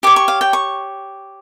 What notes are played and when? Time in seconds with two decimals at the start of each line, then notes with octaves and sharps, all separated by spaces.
0.03 G4 C#5 D6
0.16 C#6
0.28 F5
0.41 G5
0.53 C#6